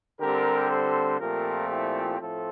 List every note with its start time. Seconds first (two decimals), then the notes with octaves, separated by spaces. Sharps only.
0.20 D3 G3 C4 G4 A#4
0.69 A4 C5
1.19 A#2 F3 A3 C4 G4 A#4
1.69 E4 G4
2.19 A2 F3 A3 C4 F4 A4